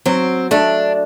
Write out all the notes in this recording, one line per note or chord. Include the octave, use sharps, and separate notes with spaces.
F#3 C4
A3 D4